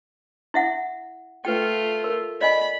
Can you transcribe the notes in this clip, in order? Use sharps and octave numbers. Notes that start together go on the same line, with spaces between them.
E4 E5 F#5
A3 F4 B4 G5
A#4
D5 D#5 G#5 B5